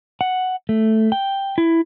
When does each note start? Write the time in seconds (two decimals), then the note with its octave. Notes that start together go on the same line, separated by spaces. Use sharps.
0.21 F#5
0.69 A3
1.12 G5
1.58 E4